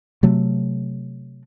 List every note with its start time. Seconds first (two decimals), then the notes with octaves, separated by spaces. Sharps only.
0.23 C3 F#3 A3